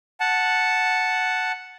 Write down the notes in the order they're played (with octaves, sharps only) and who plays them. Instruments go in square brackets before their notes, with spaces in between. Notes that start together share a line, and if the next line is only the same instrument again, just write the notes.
[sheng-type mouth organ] F#5 A5